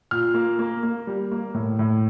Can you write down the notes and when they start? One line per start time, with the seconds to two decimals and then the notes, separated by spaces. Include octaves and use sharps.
0.11 A#2 F6
0.34 A#3
0.59 A#3
0.83 A#3
1.07 G3
1.31 A#3
1.54 A2
1.79 A2